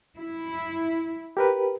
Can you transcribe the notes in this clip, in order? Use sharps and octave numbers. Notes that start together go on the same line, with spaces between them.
E4
G4 A#4 B4